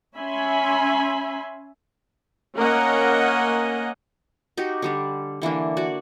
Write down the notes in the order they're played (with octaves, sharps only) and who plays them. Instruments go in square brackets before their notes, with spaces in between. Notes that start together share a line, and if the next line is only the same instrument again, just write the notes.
[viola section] C#4 E5 G#5 B5 C6
A#3 C#4 A#4 D#5 F#5
[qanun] D#4 F#4 G4
D3 G3 D4
D3 E3 A#3 D4
F#4 D5